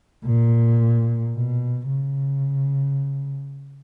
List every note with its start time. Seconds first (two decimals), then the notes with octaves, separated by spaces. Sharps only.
0.25 A#2
1.35 B2
1.89 C#3